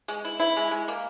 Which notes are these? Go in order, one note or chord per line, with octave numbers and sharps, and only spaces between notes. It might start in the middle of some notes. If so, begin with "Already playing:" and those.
G#3
E4
E4
G#3
G#3
A#3